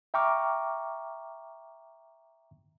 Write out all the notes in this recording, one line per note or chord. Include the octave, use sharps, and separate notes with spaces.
E5 G5 A#5 C#6 D6 F6